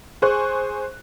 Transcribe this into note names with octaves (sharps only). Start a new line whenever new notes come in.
G#4 C5 G#5 C#6 F#6